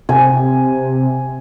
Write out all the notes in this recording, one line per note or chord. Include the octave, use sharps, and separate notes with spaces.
C3 G#5